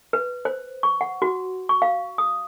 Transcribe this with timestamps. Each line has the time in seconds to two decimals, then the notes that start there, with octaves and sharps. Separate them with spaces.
0.13 B4
0.45 C5
0.83 C#6
1.01 F#5
1.22 F#4
1.69 C#6
1.82 F5
2.18 D#6